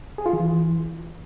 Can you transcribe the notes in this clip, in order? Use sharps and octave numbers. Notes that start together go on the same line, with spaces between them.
G#4
F4
E3